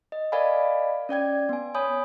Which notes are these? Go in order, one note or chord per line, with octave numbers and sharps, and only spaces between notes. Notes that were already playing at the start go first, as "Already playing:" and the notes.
D#5
A#4 D5 D#5 F5 G#5 B5
C#4 D5 G5 G#6
B3 G#5
C#5 G#5 B5 D#6 G6